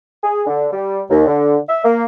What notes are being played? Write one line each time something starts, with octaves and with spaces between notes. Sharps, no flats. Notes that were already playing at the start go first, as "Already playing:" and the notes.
G#4
D3
G3
D#2
D3
E5
A#3